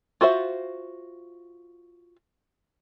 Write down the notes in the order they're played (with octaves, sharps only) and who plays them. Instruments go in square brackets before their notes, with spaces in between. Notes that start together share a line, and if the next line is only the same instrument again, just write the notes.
[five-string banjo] F4 F#4 C5 E5